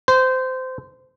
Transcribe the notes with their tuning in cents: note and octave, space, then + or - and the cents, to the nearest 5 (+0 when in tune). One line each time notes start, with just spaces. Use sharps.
C5 -20